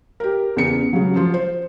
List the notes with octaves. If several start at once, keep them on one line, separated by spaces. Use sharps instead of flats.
G4 A#4
E2 C#3 C#7
C#3 F#3
F3 F4
C5